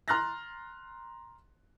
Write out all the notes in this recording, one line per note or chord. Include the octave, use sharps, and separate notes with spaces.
A#5 C6 F6 F#6 A6 A#6